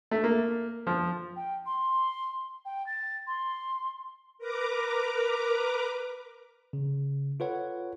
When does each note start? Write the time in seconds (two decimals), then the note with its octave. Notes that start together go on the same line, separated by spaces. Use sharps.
0.11 A3
0.24 A#3
0.87 F3
1.36 G5
1.66 C6
2.65 G5
2.87 A6
3.27 C6
4.38 A#4 B4 A#5 D6
6.73 C#3
7.40 F4 A4 B4 C#5 F#5